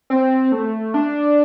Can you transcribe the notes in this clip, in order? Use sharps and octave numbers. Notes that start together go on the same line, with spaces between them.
C4
A3
D4